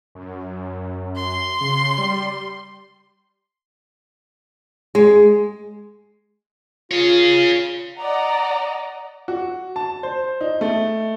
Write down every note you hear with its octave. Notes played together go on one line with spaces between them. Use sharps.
F#2
C6
C#3
G3
G#3
F4 G#4 C#5
D5 D#5 F#5 A#5
F#4
A5
C5
D#4
A3